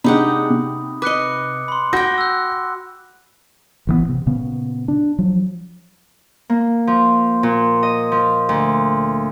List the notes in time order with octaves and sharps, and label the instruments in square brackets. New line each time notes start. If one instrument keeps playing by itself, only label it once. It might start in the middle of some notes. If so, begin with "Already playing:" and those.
[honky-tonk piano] C3 G#3 D4 [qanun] D#4 G4 F#5 [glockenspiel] B5 D#6
[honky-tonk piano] C3
[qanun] B4 D#5 [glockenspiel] D6 F#6 C#7
[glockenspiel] B5 C6
[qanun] F#4 G5 [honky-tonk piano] G6 A#6
[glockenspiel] E6 F#6
[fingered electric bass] A1 E3 G#3 B3
C3
A#2 C#3 B3
D4
F3 F#3
[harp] A#3
F3
A#2
D#5
F3
D2